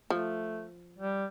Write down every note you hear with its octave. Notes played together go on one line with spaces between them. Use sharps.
F3 A3
G3